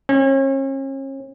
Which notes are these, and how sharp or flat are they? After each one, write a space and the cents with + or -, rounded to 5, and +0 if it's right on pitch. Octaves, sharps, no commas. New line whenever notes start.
C#4 -40